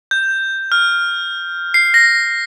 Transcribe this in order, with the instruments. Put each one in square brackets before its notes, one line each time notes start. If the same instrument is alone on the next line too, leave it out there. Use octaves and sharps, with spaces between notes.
[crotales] G6
F6
C7
A#6